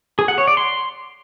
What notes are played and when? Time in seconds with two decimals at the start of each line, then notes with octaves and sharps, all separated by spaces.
0.19 G#4
0.28 F#5
0.38 C#5
0.48 D5
0.57 C6